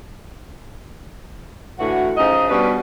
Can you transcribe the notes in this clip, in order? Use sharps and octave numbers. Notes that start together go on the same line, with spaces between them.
A2 D3 E3 F#4
C#3 F3 D#4 D#5
B2 G3 C#4 D4 B4